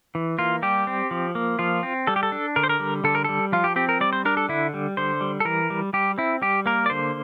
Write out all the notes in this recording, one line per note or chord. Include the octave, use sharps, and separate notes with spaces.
E3
A#3 F4
G3 G4
C4
F3
A#3
F3 F4
C4
G3 A4
G4
A4
D4
D3 A#4
C5
A#4
G3
D3 A4
A#4
G3 A4
F3 F4
G4
C4 G4
A#4
G3 D5
C5
D4 A#4
A4
D3 E4
G3
D3 C5
G3
A4
E3 A#4
G3
G3 G4
C4 E4
G3 G4
A#3 A#4
D5
D3 C5